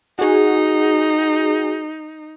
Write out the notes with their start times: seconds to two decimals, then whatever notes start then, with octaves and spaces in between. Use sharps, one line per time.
0.19 D#4 F#4 G#4